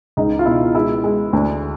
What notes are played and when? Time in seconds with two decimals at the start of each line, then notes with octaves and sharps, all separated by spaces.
0.17 C#2 D#4
0.39 F4
0.45 B2 E4
0.75 G#3 E4
1.04 G#3
1.33 D2